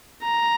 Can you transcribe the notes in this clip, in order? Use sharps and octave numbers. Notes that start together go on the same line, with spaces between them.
A#5